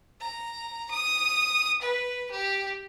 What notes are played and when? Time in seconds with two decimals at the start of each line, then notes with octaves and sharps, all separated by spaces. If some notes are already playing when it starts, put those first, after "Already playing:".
0.21 A#5
0.91 D#6
1.81 B4
2.31 G4